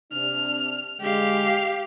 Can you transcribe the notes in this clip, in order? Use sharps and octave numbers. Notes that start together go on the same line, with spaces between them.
C3 D4 F6
D3 G#3 G4 F5